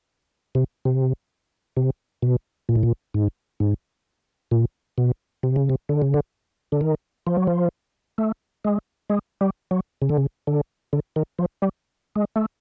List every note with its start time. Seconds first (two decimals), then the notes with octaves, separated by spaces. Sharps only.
0.55 C3
0.85 C3
1.77 C3
2.22 B2
2.69 A#2
2.76 A2
2.83 A#2
3.14 G#2
3.60 G#2
4.51 A#2
4.98 B2
5.43 C3
5.56 C#3
5.69 C3
5.89 D3
6.02 C#3
6.14 D3
6.72 D3
6.81 D#3
7.27 F3
7.37 F#3
7.47 F3
8.18 A3
8.65 G#3
9.10 G#3
9.41 G3
9.71 F#3
10.02 C#3
10.09 D3
10.17 C#3
10.47 D3
10.93 D3
11.16 D#3
11.39 F3
11.62 G3
12.16 G#3
12.36 A3